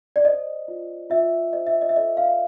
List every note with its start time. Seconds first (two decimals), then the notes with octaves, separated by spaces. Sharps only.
0.16 D5
0.25 C5 D#5
0.68 F4
1.10 F4 E5
1.53 C5 D#5
1.67 E5
1.81 D#5
1.89 E5
1.96 A4 D#5
2.17 F5